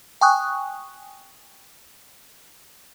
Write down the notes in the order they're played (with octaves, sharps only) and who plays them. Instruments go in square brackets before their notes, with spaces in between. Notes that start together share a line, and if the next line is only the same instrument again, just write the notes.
[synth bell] G5 G#5 C#6 D#6 F#6